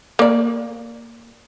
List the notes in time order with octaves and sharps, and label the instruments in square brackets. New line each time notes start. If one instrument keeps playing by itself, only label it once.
[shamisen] A#3 D5